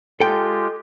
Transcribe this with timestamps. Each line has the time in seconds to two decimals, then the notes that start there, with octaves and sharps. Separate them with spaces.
0.20 G#3 F4 G4 A4 G5